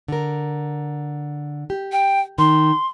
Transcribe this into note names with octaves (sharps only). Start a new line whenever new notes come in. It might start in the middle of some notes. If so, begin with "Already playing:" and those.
D3 A#4
G4
G5
D#3 C6